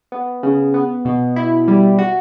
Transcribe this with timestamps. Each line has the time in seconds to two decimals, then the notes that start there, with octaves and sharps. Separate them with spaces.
0.12 B3
0.43 C#3
0.74 B3
1.05 B2
1.36 E4
1.68 G3
1.99 F#4